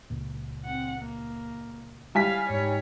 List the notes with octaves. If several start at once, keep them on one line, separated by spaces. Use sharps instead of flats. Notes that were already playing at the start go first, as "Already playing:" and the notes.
C#2 A#2
C4 F#5
A#3
G3 E4 F5 G#5 B6
G#2 D#4 C#5